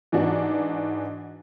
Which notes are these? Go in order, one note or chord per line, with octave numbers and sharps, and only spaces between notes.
G#2 E3 D4 F#4